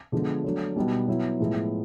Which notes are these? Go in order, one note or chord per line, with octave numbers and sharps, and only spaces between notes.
D3 F3 G#3 B3
F#3 A3 D4
B2 G3 B3 D#4
F#3 B3 E4
A2 F3 G#3 B3 E4